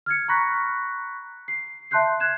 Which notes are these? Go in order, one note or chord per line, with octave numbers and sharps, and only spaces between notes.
F6 G#6 C#7
A#5 B5 C#6 F#6 A#6 B6
C7
E5 A5 C6 F#6 G6 C7
F#6 G#6 E7